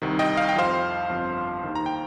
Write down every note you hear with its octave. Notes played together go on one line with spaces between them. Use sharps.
C2 C3 D#3
D#5 G5
F5
G5
F2 F3 C5 F5
G1 F2 F3
D#2 D#3
A#5
G5